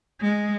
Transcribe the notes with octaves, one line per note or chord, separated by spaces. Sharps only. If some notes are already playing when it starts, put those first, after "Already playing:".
G#3